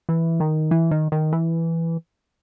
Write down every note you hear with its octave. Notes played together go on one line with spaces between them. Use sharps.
E3
D#3
E3
D#3
D#3
E3